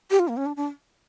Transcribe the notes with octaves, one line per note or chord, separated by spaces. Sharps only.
G4
F4
A#3
C#4
D4
D4